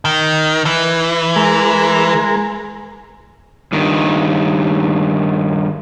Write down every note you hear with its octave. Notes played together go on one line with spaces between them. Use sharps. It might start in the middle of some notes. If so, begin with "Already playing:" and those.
D#3
E3
G#3 A#4
G2 D#3